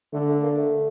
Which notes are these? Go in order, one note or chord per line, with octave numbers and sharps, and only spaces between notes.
D3 A3
A3
A#3
A3